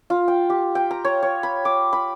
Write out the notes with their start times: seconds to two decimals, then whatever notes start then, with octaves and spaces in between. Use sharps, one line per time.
0.10 F4
0.28 G5
0.50 G4
0.75 G5
0.91 A#5
1.05 C#5
1.22 C#5
1.43 B5
1.65 D6
1.93 B5